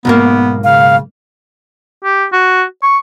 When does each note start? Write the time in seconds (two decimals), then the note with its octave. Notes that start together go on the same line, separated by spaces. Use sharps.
0.05 B1 G#2 A#3 B3
0.64 C#3 F5
2.04 G4
2.32 F#4
2.82 C#6